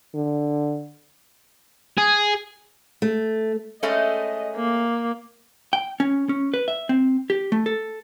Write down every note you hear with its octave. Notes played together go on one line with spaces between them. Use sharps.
D3
G#4
A3
G#3 A3 C#4 D#5
A#3
G5
C#4
C#4
B4
E5
C4
G4
A3
A4